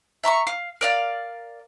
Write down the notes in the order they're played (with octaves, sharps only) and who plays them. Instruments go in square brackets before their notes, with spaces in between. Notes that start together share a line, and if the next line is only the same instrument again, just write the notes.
[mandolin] E5 A#5 C6 C#6
F5
A#4 D5 F5